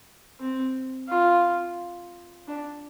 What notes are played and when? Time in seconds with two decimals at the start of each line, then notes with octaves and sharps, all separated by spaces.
0.40 C4
1.09 F4
2.48 D4